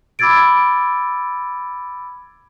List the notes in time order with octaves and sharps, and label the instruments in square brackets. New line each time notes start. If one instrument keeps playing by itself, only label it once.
[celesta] B5 D6 E6 G#6 A6 D7